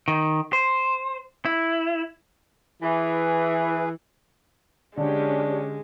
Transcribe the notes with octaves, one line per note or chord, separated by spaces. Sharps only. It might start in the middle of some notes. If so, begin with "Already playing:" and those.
D#3
C5
E4
E3 G#4 B4
D3 G#3 C#4 D4 G4